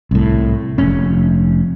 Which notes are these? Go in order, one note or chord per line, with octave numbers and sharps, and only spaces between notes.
C2 A2
F1 C#4